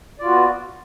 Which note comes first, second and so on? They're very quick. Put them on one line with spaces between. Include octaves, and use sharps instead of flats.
D5 F4 F#4 B3